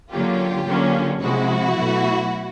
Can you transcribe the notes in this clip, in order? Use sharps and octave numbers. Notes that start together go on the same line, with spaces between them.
D3 F#3 A#3 C#4 F4 G4
D3 F#3 A#3 C#4
C3 F3 G#3 E4 F#4
B2 F#3 A3